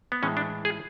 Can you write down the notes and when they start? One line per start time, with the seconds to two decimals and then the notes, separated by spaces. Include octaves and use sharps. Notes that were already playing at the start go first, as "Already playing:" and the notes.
0.12 B3
0.23 A2 E3 G#3 C#4
0.37 D4
0.65 G#4